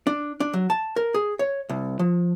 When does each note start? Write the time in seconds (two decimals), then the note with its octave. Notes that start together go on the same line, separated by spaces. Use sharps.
0.07 D4
0.40 D4
0.53 F#3
0.70 A5
0.96 A#4
1.14 G#4
1.39 C#5
1.69 C2
1.99 F3